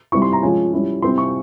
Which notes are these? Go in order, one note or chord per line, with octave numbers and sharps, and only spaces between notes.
G3 C4 E4 C#6
C6
A#5
F3 G#3 C#4 F4 G#5
G3 C#4 E4
G3 C4 E4 C6
C#6